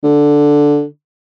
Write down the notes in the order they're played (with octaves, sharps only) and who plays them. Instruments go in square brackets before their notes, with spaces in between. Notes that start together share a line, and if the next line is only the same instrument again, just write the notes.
[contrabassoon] D3